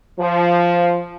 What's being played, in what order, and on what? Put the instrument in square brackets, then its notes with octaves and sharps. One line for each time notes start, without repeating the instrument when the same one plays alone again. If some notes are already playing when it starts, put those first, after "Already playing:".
[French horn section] F3